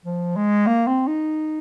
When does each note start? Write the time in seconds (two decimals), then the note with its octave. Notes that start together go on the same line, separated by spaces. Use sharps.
0.05 F3
0.36 G#3
0.67 A#3
0.87 C4
1.07 D#4